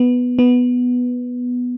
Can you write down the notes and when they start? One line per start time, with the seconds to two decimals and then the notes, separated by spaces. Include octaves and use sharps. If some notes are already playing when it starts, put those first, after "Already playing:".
Already playing: B3
0.39 B3